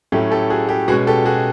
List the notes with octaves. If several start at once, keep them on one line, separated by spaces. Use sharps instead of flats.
A2 F#3 A3 C#4 G4
G4 A4
F#4 G#4
G4
B2 G#3 C#4 F#4 G#4
G4 A4
F#4 G#4